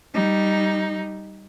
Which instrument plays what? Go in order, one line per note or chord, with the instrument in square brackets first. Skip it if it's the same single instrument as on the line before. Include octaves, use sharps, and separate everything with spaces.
[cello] G3 D#4